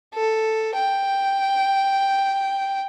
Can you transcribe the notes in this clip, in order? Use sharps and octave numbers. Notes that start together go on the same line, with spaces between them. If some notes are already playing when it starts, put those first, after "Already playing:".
A4
G5